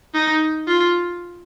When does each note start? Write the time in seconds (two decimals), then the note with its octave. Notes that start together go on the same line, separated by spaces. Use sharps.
0.14 D#4
0.67 F4